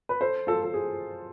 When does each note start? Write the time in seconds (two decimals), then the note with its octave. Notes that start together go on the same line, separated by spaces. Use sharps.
0.09 B4
0.21 A4 C5
0.47 F4 A4
0.63 A4
0.74 G#4